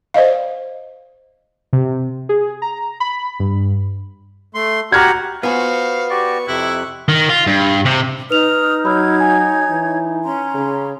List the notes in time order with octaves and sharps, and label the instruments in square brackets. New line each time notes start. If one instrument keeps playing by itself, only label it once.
[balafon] C5 D5 D#5 F5
[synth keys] C3
G#4
A#5
B5
G2
[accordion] A3 C6
[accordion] F#4 G4 F#5 [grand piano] A#5 F6 G#6
[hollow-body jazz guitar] B3 F4 G#5 [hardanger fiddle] F#4 C5 [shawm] F5
[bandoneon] F#4 G4 D5 [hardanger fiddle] C#6
[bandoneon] F2 C3 F#6 [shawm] E4
[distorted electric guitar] D#3
F4
G2
C3
[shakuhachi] D#4 [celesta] B4 F7 [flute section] D#6 F6
[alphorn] F#3 [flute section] C#5 G#6 [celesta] B5 E6 F6
[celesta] G#5
[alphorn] E3
[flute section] C#4 A#5 C6
[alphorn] C#3